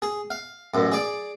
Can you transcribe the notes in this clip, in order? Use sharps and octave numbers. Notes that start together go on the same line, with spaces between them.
G#4
F5
A1 F#2
G#4 D5